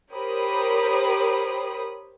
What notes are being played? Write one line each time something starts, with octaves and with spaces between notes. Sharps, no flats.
G4 A#4 C5 C#5 B5 D#6